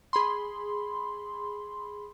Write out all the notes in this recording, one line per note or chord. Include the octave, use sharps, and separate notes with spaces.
G#4 B5 C6